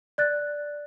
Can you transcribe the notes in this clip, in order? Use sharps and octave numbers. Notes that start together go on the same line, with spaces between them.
D5 F#6 A6